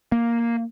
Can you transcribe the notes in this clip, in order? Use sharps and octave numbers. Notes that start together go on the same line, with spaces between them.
A#3